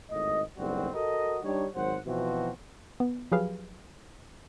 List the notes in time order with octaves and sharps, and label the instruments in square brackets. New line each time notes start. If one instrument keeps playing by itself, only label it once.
[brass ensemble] G#1 A2 D#5
F#1 B1 G3 C4 F#4
F#4 A4 A#4 D#5
G3 D4 D#4 C#5
G#1 F#3 C5 F#5
B2 E3 F3 C4 F#4
[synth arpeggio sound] B3
F3 F#3 G4 G#4 B4 F5